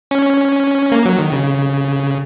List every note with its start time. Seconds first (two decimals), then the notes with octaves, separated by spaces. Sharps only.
0.11 C#4
0.92 A#3
1.05 F#3
1.19 D#3
1.32 C#3